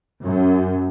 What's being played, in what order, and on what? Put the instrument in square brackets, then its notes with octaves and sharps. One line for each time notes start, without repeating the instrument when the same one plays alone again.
[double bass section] F#2